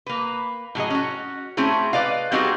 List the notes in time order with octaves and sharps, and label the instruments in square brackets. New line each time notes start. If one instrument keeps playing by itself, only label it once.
[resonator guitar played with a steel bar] A#3 B4
A2 F#3 G#4 D#5
C#4 F#4
A3 C4 C#4 E4 G#4
B4 D5 D#5 F5
G3 B3 C4 D#4 F#4 G#4